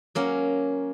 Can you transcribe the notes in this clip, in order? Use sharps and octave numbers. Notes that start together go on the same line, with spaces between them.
F#3 A#3 C#4